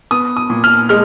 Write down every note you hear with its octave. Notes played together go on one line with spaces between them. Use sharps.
B3 D#6
D#6
A#2
F6
G#3 F6